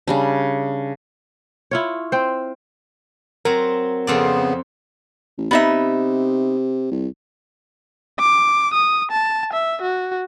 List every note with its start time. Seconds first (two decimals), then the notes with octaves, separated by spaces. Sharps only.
0.07 C#3 G3 D4
1.71 E4 F4 C#5
2.12 C4 C5
3.45 F#3 C4 A#4
4.07 F2 C#3 B3 C4 D5
5.38 A1
5.51 C3 B3 D#4 E5
6.91 C2
8.19 D6
8.74 D#6
9.11 A5
9.53 E5
9.81 F#4